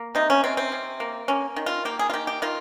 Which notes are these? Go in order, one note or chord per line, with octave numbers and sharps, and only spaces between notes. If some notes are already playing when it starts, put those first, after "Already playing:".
Already playing: A#3
C3 D#4
C#4
C3 C4
C4
C3
A#3
A#3 C#4
D#3
F4
A#3 G4
G#4
F4
D#3 G4
G4
D#3 F4